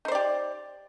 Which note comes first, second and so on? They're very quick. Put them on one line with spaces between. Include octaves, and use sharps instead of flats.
D#4 C5 D5 G4